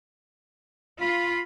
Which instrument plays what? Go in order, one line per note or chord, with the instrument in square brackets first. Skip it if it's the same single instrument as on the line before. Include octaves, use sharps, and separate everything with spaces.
[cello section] F4 [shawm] B5